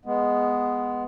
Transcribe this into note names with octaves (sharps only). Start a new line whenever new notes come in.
G#3 B3